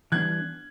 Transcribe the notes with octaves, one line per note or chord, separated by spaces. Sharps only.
E3 G3 B3 D4 F#6 G#6